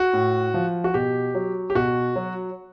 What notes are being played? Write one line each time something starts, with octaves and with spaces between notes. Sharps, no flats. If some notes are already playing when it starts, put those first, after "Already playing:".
Already playing: F#4
A2
F3
F#4
B2 G4
F#3
G4
B2 F#4
F#3